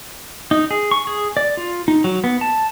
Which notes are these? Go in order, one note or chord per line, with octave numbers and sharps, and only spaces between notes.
D#4
G#4
C#6
G#4
D5
F4
D#4
F#3
B3
A5